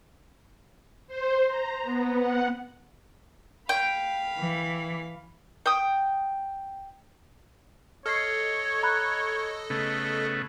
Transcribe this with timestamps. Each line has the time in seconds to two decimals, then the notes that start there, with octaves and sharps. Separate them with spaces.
1.07 C5
1.47 A#5
1.82 B3
2.16 F#5
3.69 F5 G5 B5
4.38 E3
5.66 G5 D#6
8.06 A4 C#5 D#5 F6 C7
8.83 A#5 B5 F#6
9.70 C#3 A3 B3